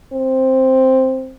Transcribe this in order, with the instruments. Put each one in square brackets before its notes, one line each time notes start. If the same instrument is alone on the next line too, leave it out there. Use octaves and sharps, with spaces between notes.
[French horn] C4